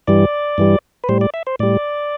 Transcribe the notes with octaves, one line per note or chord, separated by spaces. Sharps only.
G2 E3 G3 D5
G2 E3 G3
B4
A2 G3 C5
D5
E5
C5
A2 G3 D5